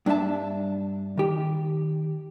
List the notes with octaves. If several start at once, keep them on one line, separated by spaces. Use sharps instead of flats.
G2 D4 F4 E5 A5
D#3 G4